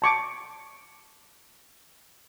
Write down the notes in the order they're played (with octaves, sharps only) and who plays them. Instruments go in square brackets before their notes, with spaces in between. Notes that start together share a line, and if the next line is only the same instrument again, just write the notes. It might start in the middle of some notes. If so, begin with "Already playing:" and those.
[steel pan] A5 C#6 D6